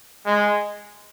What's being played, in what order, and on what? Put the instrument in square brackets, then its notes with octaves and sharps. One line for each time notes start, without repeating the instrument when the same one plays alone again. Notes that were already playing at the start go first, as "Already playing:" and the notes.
[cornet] G#3